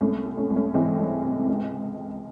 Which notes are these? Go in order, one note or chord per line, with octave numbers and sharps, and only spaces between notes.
C2 A3 C#4
C3
A3 C#4
C2
A3 C#4
E3 G#3 C4
C2
C3
C#2